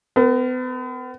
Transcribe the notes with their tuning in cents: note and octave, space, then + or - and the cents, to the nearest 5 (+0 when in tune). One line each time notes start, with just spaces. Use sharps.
B3 +40 A#4 +0